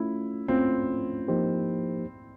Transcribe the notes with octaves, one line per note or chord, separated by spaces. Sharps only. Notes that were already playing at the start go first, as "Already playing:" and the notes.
Already playing: A3 C#4 E4 F4
A3 C4 C#4 F4
F3 A#3 D#4 G4 C5